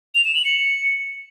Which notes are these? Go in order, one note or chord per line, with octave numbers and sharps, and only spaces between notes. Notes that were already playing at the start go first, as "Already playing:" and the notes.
F7
E7
F#7
C#7